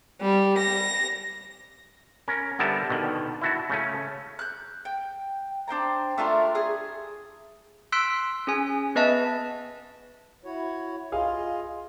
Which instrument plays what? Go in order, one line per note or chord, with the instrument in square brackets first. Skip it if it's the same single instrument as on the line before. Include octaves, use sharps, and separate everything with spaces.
[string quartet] G3
A#6
[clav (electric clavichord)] C#4 A#4
D3 G3 B3 A#4 E5 A5
B2 D3 D#3
E4 F#4 A5
C#3 A3 C#4
[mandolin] F#6 G6
G5
D4 C5 G5 A#5
A3 D4 F4 A#4
G#4 D#6
[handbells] C6 E6 F#6 B6 D7
C#4 G#4 G#5
B3 B4 D#5 E5 A5
[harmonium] E4 F#4 C#5
[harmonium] F4 D#5 [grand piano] G#4 F5 G#5